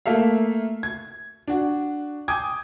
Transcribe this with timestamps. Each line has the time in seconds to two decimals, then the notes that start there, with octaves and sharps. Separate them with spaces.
0.06 A3 A#3 A4 E5 F5
0.83 G#6
1.48 D4 F#4
2.28 G5 G#5 D6 D#6 G#6